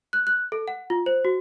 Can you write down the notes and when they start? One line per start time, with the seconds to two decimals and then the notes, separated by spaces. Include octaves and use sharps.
0.13 F#6
0.27 F#6
0.52 A4
0.68 F#5
0.90 F4
1.06 C5
1.25 F#4